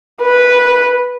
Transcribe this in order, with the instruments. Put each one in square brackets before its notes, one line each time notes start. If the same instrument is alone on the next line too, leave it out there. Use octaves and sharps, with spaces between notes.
[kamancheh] B4